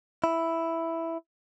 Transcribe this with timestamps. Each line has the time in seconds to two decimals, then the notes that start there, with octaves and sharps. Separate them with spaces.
0.24 E4